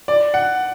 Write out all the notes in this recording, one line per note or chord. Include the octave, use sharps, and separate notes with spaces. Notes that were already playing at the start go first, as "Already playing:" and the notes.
D5
F#5